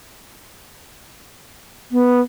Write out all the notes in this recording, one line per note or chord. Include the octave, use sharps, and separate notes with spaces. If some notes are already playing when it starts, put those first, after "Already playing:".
B3